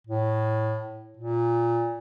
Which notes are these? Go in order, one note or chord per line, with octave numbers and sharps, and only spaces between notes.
A2
A#2